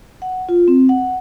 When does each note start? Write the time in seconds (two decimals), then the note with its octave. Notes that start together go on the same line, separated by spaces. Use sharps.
0.22 F#5
0.49 F4
0.68 C4
0.89 F#5